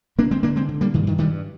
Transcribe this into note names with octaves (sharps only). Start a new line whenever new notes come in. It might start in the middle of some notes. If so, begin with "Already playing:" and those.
D3 A#3 D4
G#3 C4
D3 A#3 D4
G#3 C4
D3
G3 A#3
G2 D#3
D#3
G2 D#3 G3